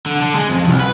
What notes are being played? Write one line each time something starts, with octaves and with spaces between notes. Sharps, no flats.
D3
D3
G#3
F2
C2 F2
B4